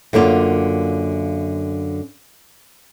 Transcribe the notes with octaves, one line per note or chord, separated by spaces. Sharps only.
F#2 D3 A#3 F4